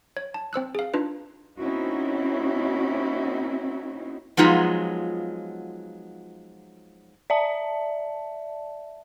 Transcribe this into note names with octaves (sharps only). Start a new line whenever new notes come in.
C#5
A5
C4 C5 E6 F#6
G#4 F5
D4 D#4 F4 B4
A#3 C4 C#4 D#4 E4 F#4
F3 F#3 G#3 B3 D#4 F4
D5 E5 A5